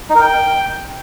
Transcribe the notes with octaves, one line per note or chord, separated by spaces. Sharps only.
D#4
A#4
G5